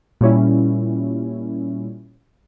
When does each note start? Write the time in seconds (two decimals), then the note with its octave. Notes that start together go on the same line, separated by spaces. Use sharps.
0.21 A#2 G3 C#4 E4